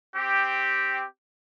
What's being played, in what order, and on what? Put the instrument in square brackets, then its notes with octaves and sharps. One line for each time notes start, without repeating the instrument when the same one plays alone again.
[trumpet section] C4 G4